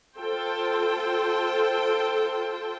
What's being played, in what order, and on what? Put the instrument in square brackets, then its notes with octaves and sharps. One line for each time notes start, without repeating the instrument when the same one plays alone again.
[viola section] F4 A4 C5 G5 A5